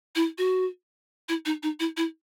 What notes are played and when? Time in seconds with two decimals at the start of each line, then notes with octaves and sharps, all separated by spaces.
0.15 E4
0.38 F#4
1.29 E4
1.45 D#4
1.63 D#4
1.80 E4
1.97 E4